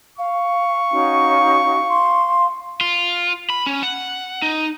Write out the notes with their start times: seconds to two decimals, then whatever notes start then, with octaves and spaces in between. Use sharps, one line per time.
0.18 F5 C#6
0.91 C#4 D#4 F#4
1.87 C6
2.81 F4
3.50 B5
3.66 C#4
3.83 F#5
4.42 D#4